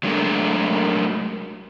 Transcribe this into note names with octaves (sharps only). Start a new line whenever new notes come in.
F#3 G#3 A3 D4 G#4 A#4